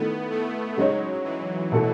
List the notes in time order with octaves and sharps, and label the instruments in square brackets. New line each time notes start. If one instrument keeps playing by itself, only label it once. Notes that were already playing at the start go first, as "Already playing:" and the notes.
Already playing: [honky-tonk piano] D#3 A3 E4 [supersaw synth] B3
[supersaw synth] A3
[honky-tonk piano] C#3 G#3 D#4 G#4 C#5 [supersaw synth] F#3
[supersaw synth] E3
[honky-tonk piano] B2 A3 E4 A4